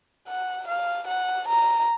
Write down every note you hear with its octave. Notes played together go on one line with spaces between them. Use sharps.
F#5
F5
F#5
A#5